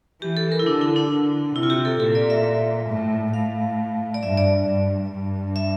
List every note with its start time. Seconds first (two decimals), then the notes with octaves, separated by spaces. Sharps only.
0.22 E3 G4
0.37 A4
0.52 A#4
0.59 E4
0.66 D3 D4
0.81 E4
0.96 D4
1.11 D3
1.55 C3 E4
1.63 F4
1.70 G4
1.85 A4
2.00 A#2 A4
2.15 D5
2.30 E5
2.89 A2
3.34 A2 F5
4.14 D5
4.23 G2 E5
4.38 D5
4.67 G2
5.11 G2
5.56 E5